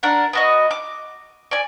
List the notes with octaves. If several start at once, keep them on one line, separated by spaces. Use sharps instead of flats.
D4 A#4 F#5
B3 F#4 D#5
D6
D5 G#5